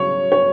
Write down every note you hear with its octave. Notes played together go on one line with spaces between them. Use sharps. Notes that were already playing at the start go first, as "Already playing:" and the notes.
Already playing: C#3 F#3 C#5
C#5